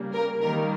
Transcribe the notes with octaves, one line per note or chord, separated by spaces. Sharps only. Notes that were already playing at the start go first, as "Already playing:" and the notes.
Already playing: C#3 G3 A#3
A#4
D#3 G3 A#3 A#4